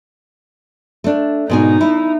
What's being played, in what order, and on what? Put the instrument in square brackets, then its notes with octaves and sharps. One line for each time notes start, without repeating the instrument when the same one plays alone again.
[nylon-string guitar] A3 D4
[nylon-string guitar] G#2 B2 G#5 [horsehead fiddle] D#4
[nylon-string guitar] E4